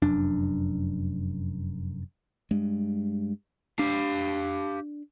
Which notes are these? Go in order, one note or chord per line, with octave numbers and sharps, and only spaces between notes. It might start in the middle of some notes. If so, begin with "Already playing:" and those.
F1 F#2 D4
G2 G#3
D4 G4 F5